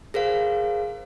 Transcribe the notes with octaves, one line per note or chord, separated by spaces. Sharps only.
G#4 A#4 C5 F5